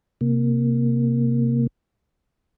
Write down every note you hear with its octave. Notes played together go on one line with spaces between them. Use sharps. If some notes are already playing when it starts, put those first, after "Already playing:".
C3 A#3